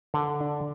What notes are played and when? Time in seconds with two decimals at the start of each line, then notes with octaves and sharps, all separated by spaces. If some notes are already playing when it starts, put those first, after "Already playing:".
0.14 D3
0.41 D4